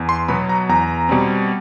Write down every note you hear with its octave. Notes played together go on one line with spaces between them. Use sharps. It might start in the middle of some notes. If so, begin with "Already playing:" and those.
Already playing: E2
C6
B2 F#3 B3 B5
A#5
E2 A#5
B2 G3 C4